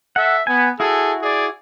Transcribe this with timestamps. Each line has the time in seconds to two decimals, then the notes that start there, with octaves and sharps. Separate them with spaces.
0.16 A4 E5 F#5
0.47 B3 G#5
0.80 E4 F#4 G#4 A4
1.22 G#4 D5